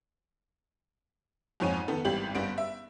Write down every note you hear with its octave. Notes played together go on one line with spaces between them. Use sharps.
F2 G#2 F3 C#5 G#5 D#7
D#3 B3 A4
G#1 E3 G3 G4 F#7
G1 G3 B3 D7
E5